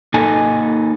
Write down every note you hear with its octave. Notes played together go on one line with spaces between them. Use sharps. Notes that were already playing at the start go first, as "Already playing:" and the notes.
A#3 D#4 A4 D#5 G#5